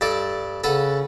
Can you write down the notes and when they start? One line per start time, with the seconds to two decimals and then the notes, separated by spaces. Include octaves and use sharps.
0.01 G2 A4 D5
0.64 C#3 A4 B4 F#5